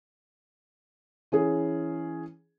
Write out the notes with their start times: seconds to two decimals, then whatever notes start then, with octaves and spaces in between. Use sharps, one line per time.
1.32 E3 C#4 G#4